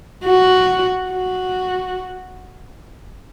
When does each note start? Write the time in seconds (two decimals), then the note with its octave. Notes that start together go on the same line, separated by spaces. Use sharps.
0.25 F#4
1.10 F#4